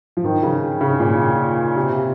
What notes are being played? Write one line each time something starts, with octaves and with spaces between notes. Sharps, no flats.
F3
D#3
C#3
C#3
A#2
C3